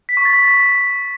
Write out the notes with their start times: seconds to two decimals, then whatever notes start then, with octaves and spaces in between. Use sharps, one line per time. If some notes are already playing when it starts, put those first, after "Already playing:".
0.09 B6
0.17 C#6
0.25 A6
0.34 B6